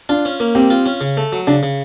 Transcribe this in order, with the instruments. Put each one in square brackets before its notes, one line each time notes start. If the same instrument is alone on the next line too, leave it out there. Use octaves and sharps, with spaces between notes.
[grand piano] D4 [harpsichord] F4
[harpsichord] C#4
A#3
[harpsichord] G3 [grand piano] C4
[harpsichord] F4
C#4
C#3
A3
F#3
[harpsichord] C#3 [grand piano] D4
[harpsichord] C#3